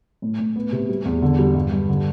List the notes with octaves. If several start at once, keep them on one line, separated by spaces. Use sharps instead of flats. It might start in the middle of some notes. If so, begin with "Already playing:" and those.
A2
A2
B3
C3
G3
E2
D3
G3
G2
G2
D3